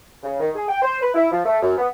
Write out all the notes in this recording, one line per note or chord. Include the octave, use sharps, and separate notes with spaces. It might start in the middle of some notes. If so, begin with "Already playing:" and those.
C#3
D#3
G#4
G5
C5
B4
E4
F3
A3
F#2
B3